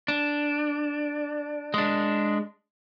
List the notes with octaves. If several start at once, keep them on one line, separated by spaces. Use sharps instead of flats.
D4
G#3 D4